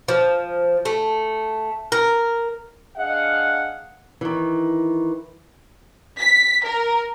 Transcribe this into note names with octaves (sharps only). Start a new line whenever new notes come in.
F3
A3
A#4
D4 G#4 D#5 F5 F#5
D#3 E3
B6
A#4